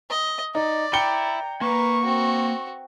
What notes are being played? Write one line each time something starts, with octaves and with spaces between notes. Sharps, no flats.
D#5
D#4 D5
E5 G5 A#5 B5 C#7 G7
A#3 A#4 B4 C#6
C4 F#4